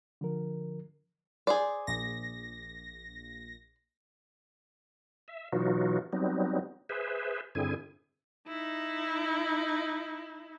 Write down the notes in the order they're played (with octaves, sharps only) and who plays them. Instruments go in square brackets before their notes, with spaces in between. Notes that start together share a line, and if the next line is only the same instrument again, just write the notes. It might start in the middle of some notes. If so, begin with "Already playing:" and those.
[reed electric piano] D3 F3 A#4
[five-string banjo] G#4 C5 D5
[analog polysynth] A#1 A#6
[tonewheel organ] E5
B2 E3 F#3 D#4 F4 F#4
F#3 G3 B3 C4 D#4
G#4 B4 C5 E5
G2 D3 C4 E4 G#4 G#5
[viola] D#4 E4